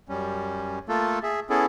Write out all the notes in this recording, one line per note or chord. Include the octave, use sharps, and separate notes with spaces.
F#2 G3 C#4
A3 A#3 F4 A4
G#4 E5
B3 C#4 E4 G#4 A4